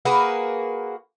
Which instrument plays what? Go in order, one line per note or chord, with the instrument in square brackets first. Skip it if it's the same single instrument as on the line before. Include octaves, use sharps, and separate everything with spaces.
[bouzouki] A#3 F#4 G#4 B4